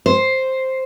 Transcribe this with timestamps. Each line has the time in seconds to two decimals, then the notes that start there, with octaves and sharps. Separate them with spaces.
0.06 C5